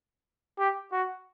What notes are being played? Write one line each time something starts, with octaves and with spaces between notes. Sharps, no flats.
G4
F#4